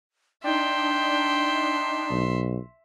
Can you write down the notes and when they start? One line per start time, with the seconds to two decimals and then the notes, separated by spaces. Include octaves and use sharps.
0.44 D4 D#4 E5 G5 C6
2.11 B1